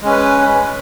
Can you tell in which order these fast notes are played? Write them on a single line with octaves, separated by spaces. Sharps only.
G#3 C#4 B4